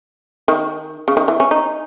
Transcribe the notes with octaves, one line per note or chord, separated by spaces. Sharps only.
D#3
C#3
D#3
E3
C#4
D#4